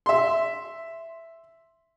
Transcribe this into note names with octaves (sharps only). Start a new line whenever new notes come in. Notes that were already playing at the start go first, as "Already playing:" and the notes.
E5 C6